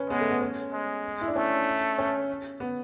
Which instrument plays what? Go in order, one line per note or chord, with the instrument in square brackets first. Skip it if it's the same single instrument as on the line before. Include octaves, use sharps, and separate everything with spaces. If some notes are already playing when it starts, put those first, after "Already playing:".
Already playing: [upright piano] C#4 B4
[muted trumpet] G#3 [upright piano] B3
[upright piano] A3
B3
C#4
[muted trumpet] G#3
[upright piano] E4
D4
[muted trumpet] A3 [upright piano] C#4
[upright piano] C#4
B3